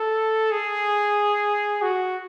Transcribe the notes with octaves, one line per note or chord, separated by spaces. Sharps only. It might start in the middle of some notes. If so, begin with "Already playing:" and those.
Already playing: A4
G#4
F#4